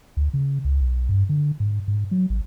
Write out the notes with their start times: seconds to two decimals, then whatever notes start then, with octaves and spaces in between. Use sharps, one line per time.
0.17 D2
0.33 C#3
0.65 C#2
0.80 B1
1.09 G2
1.29 D3
1.60 G#2
1.88 G#2
2.11 F#3
2.30 A1